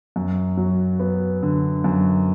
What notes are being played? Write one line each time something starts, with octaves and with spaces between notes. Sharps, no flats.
F#2
F#3
B3
D3
F#2